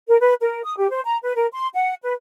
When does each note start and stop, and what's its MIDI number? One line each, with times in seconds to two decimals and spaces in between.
0.08 0.17 70
0.20 0.34 71
0.41 0.61 70
0.64 0.74 87
0.77 0.90 67
0.91 1.01 72
1.05 1.17 82
1.23 1.34 71
1.36 1.46 70
1.52 1.68 84
1.74 1.94 78
2.03 2.12 71